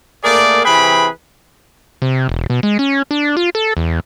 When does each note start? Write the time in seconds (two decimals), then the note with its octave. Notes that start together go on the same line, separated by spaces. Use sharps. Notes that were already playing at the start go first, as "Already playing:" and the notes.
0.24 A3 A#3 G#4 A#4 D5
0.64 C3 E3 G#4 B4 G5 B5
2.02 C3
2.29 E1
2.50 B2
2.63 G#3
2.79 C#4
3.11 D4
3.37 F4
3.55 A4
3.77 E2